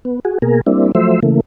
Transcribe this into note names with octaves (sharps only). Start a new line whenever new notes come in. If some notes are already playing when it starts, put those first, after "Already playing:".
B3
F#4 G#4
B2 A#3 G#4 A#4
G3 A#3 C4 D4 E4
F3 F#3 A3 C5 E5
C#3 E3 A3 A#3